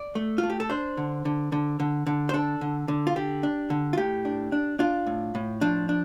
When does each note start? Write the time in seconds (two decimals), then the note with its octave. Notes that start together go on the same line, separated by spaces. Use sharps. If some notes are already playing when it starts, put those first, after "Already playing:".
Already playing: D5
0.15 A3
0.38 F4
0.43 A3
0.50 G4
0.60 A4
0.70 D4 C5
0.97 D3
1.25 D3
1.52 D3
1.80 D3
2.07 D3
2.29 C5
2.33 D4 A4
2.61 D3
2.88 D3
3.07 F4
3.16 D3 G4
3.43 D4
3.70 D3
3.93 F4
3.98 A2 G4
4.25 D4
4.52 D4
4.79 D4 F4
5.07 A2
5.35 A2
5.61 F3 D4
5.89 D4